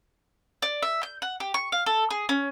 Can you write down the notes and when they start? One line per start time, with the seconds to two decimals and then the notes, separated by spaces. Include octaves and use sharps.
0.62 D5
0.83 E5
1.03 G6
1.22 F#5
1.40 G4
1.54 C#6
1.72 F5
1.86 A4
2.10 G#4
2.29 C#4